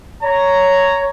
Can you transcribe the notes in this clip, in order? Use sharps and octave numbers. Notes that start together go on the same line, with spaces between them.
C#5 A#5